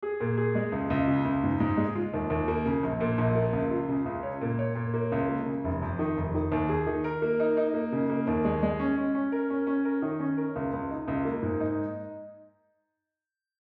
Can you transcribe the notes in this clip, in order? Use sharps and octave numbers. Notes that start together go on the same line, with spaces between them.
G#4
A#2
G#4
G#3
C#2
C#2
C#3
C#2
G#2
G#2
G#3
F4
D#2
D#2
A#3
C#3
A#1
A#2
A#1
A#3
C#2
F4
C#3
C#2
C#5
A#2
C#5
A#2
A#3
C#2
A#3
C#3
F1
F2
D#3
F1
D#3
D#2
G#4
D#3
A#4
A#3
D#4
D#4
A#3
C#3
A#3
D#2
G#3
G#3
C#4
C#4
C#4
A#4
C#4
C#4
A#4
D#3
C#4
A#4
C#2
C#2
D#4
C#2
A#3
G#2
D#4